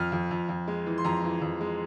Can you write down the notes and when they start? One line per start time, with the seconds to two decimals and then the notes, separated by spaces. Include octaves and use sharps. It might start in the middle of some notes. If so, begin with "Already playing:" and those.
Already playing: F2 F6
0.12 F2
0.31 F2
0.49 F2
0.68 G#3
0.86 E3
0.98 C6
1.05 F2 A#5
1.24 E3
1.42 F2
1.61 G#3